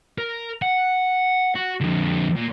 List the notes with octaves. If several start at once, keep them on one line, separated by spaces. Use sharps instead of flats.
A#4
F#5
F#4
F2 D3
A#2